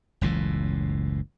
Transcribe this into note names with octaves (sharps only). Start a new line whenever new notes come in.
F#1 C#2 A2 E3